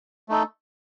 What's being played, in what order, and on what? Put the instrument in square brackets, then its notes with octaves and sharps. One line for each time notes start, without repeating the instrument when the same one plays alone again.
[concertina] A3 D#4 A4